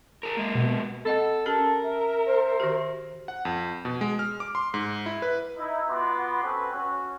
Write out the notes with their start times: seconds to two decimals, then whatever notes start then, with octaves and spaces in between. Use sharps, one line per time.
0.23 G#4 A#4
0.37 G#3 A#3
0.55 B2
1.05 C4 A4 D#5 F#5
1.46 C#4 G4 A4 A#4 A5
1.84 E5
2.27 C5
2.60 D#3 F#4 G4
3.28 F#5
3.45 F2
3.85 B2
4.01 G#3
4.19 F6
4.40 D6
4.55 C6
4.74 G#2
5.06 E4
5.22 B4
5.58 D#4 E4
5.90 B3 F4 F#4 B5 C6 D6
6.42 C4 C#4 F#4 A4 B4
6.72 C#4 F#4